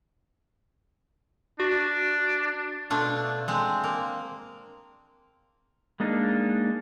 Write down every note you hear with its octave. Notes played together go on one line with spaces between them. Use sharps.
D4 F#4
B2 A3 D4 F4
G#3 C4
A#3
G#3 A#3 D4 D#4